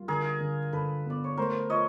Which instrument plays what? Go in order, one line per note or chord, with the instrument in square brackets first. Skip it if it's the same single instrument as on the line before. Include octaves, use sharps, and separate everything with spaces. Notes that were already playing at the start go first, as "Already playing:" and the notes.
Already playing: [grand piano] G3 A#3 [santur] F4
[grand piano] D3 [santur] G#4 A#4
[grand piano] D3
[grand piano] D3 [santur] A4 B4
[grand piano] B3 [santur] D5
[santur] C#5
[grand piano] A3 [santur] A#4 C5
[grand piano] F3 [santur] C#5 D#5